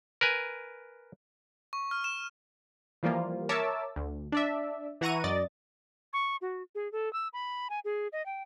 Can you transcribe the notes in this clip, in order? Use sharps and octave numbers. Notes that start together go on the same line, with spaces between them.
A#4 B4 G#5
C#6
F6
E7
E3 F3 G3 A#3 F4
A#4 C#5 E5 A5 D6 E6
D2
D4 D5 E5
E3 E4 F#5 A#5 C#6 D#7
F#2 D5 D#5 A6
C#6
F#4
G#4
A4
E6
B5
G#5
G#4
D#5
G5